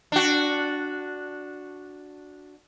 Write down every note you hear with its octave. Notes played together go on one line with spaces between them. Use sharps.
D4 F#4